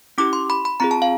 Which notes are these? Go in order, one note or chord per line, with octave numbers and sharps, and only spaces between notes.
C#4 E4 G4 D6
C6
B5
B5
C4 F4 G#4 A#5
A5
F5